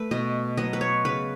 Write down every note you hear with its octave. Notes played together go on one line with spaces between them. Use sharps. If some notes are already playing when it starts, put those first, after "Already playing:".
Already playing: A3 B4
B2 D#5
F#3 B3 D#5
B4
C#5
C#3 B4